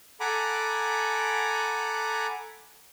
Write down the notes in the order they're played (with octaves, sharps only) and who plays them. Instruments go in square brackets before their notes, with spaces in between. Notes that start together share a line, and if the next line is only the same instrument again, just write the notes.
[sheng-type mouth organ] A4 F#5 G#5 A#5 B5 D6